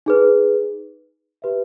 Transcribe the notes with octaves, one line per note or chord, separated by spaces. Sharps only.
D#4 G#4 B4
G4 B4 E5